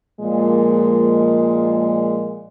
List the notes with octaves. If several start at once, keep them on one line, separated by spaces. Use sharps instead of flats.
A#2 F3 G#3